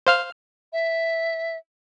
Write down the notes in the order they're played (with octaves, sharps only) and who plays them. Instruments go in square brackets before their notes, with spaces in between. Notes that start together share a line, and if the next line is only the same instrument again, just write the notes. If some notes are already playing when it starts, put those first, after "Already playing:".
[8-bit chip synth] C5 F5 F6
[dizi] E5